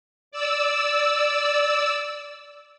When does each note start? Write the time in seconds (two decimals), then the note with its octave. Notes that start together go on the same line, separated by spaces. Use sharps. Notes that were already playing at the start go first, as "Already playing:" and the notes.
0.32 D5 E6